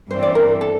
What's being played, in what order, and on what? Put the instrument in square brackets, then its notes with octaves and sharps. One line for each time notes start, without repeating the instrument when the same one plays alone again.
[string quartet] G2 E3 G3 C4 [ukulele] C5
[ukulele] D5
A#4
A4